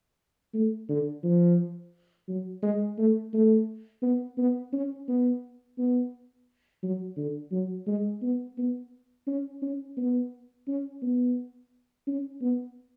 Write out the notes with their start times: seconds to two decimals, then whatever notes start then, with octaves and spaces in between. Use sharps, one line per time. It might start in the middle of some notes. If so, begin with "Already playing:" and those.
0.54 A3
0.89 D3
1.23 F3
2.28 F#3
2.62 G#3
2.98 A3
3.33 A3
4.02 B3
4.38 B3
4.73 C#4
5.08 B3
5.78 B3
6.83 F#3
7.17 D3
7.52 F#3
7.87 G#3
8.22 B3
8.58 B3
9.27 C#4
9.62 C#4
9.97 B3
10.68 C#4
11.02 B3
12.07 C#4
12.41 B3